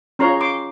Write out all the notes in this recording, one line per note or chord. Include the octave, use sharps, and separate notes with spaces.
C#4 F4 G#4 C#5 A#5 C6
C6 D6